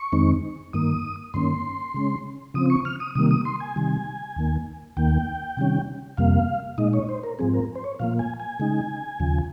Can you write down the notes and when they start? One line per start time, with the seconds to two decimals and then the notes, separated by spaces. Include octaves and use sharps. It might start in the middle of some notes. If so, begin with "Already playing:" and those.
Already playing: C#6
0.12 F2 D#3 G#3 C4 D#4
0.73 G2 D#3 A#3 D#6
1.34 G2 D#3 A#3 C#4 C6
1.94 C#3 G#3 C#4
2.54 C#3 F3 C4 D#6
2.70 C#6
2.85 F6
3.00 D#6
3.15 C3 D#3 G3 A#3 D#6
3.31 D#6
3.45 C6
3.60 G#5
3.76 C3 D#3 G3
4.36 D#2 D#3 A#3
4.97 D#2 D#3 A#3 G5
5.57 C3 D#3 G3 C#4
6.17 F2 C3 G3 A#3 F5
6.78 A#2 G#3 D#4 D#5
6.93 C#5
7.09 C5
7.23 A#4
7.39 G#2 F3 C4 G#4
7.54 A#4
7.75 C5
7.84 C#5
7.99 A#2 F3 A#3 F5
8.19 G#5
8.40 G#5
8.59 C#3 G#3 D#4
9.20 D#2 C#3 F3